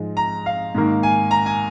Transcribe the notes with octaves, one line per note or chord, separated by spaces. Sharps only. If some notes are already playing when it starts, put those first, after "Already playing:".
Already playing: G#2 F3 G#3
A#5
F5
G#2 D#3 A#3
G#5
A#5
G#5